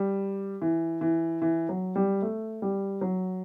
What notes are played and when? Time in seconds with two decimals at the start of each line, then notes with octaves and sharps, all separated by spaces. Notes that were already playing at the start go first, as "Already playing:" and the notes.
Already playing: G3
0.62 E3
1.01 E3
1.42 E3
1.69 F#3
1.96 G3
2.22 A3
2.62 G3
3.01 F#3